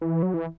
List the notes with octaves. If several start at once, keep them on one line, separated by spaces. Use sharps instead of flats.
E3
F#3
E3